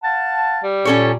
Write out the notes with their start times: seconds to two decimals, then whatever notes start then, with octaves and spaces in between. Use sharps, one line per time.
0.03 F5 F#5 A5
0.63 G3
0.85 A#2 C#4 A4 C#5